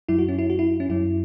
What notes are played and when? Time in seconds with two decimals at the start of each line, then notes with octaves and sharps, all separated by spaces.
0.09 F#2 F#3 E4
0.18 F#4
0.28 C#4
0.39 E4
0.50 F#4
0.59 E4
0.80 C#4
0.89 F#2 F#3 E4